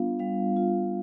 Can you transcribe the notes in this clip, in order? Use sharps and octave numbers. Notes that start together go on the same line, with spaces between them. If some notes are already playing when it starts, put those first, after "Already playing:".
Already playing: G3 B3 D4 F4 F5
G3 F5
F4